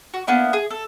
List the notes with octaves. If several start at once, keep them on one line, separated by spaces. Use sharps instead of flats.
F#4
A#3 B3 D4 E4
G#4
A4